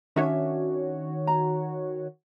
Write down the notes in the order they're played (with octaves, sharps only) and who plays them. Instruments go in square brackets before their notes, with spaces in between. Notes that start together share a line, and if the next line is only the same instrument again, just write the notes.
[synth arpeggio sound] D#3 F#4 C#5 [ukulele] C#4 D4 E5
[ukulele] A#5